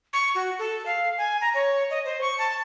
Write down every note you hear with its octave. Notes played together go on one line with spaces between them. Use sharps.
C#6
F#4
A4
F5
G#5
A#5
C#5
D#5
C5
C#6
A5